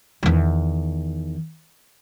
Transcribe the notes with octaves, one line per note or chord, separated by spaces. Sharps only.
E2 D#3